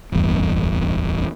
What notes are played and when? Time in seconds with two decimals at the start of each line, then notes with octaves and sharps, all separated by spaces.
0.12 D1 G1 E2 G2